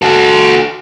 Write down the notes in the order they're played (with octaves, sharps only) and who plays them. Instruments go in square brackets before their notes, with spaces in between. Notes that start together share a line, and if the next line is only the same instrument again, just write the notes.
[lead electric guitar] F#4 A4